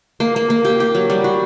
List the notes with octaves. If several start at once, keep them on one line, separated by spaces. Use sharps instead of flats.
A#3
A#3
A#3
G4
G4
F#3
G3
F#4